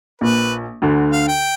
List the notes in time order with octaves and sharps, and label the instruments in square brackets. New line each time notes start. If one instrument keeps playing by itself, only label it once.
[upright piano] A#1 A#2 [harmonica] B4
[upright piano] D2 D3
[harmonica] F5
G5